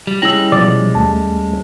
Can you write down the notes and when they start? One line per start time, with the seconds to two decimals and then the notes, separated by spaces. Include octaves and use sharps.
0.07 G3
0.22 G3 G#3 C#4 E4 G5 E6 A#6 F#7
0.52 B2 F3 F#3 D5
0.95 D#2 A3 A5